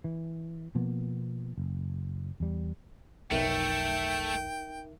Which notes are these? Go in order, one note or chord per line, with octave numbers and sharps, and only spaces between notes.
E3
B2 F3 A#3 B3
F#1
E2 G3
F1 B1 A3 D#4 A#4 E5 G5